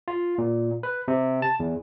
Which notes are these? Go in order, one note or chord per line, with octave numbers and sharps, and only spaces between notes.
F4
A#2
B4
C3
A5
E2